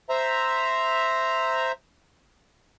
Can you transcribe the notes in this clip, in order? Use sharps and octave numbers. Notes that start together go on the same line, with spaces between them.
C5 E5 A#5